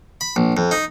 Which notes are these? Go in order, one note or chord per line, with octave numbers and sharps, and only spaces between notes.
B5
A#1
F2
D#4